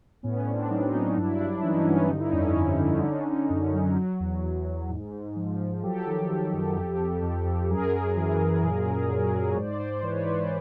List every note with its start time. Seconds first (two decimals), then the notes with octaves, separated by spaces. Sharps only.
0.23 A2 B3 C#4
0.46 A2 C4 D4
0.70 F#3 C#4 D#4
0.93 F#3 C#4 D#4
1.17 G2 D4 E4
1.40 G2 D4 E4
1.52 E4
1.63 E3 C#4 D#4
1.87 G2 B3 C#4
2.09 D3 D#4
2.20 E4
2.31 F2 C#4 D#4
2.56 F2
2.80 D3
3.03 D3
3.27 D3
3.50 F#2
3.74 F#3
3.96 F#3
4.20 E2
4.44 E2
4.66 E2
4.90 G#2
5.13 G#2
5.36 F3
5.60 F3
5.83 F#3 G4 A4
6.06 D#3
6.29 D#3
6.53 F#2
6.76 F2
7.00 F2
7.22 F2
7.45 F2
7.70 F#2 G#4 A#4
7.92 F#2
8.16 E3
8.40 F#2
8.63 A#2
8.86 A#2
9.09 F#3
9.33 F#3
9.49 C#5
9.55 G#2 C5 D5
9.78 G#2 C5 D5
10.02 E3 B4 C#5
10.21 C#5
10.25 E3 C5 D5